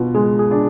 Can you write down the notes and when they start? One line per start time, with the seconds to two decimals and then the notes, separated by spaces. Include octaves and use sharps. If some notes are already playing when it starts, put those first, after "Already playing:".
Already playing: B2 F4
0.15 G#3 G#4
0.39 G#4
0.51 D4